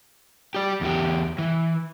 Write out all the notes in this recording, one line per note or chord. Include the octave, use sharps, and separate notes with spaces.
G4 D5
E2 G4
E3